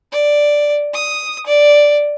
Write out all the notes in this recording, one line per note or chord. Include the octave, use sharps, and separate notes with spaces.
D5
D#6
D5